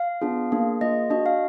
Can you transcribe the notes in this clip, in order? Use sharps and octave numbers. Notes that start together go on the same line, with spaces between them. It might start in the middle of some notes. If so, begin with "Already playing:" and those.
Already playing: F5
B3 D4 F4 G#4
A#3 D4 G#4
A#3 F4 G#4 D#5
D4 F#4 D#5
F5